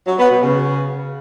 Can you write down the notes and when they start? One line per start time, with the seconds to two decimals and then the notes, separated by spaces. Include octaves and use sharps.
0.07 F#3
0.19 B3
0.31 B2
0.42 C#3